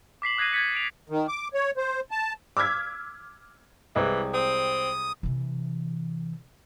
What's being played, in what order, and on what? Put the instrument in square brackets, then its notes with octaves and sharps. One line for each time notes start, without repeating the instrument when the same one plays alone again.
[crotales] D6 B6 C7 F#7
D#6 F#6 G#6 A#6 C7 D#7
G#6 A6 B6 C#7
D7 F7
[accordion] D#3
D6
C#5
C5
A5
[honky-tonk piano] D6 E6 F6 G#6 B6
[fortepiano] C2 G#3 [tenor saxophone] E3
[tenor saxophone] C4 [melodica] D#6
[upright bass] C3 E3